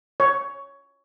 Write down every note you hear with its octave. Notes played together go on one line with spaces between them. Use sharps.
C#5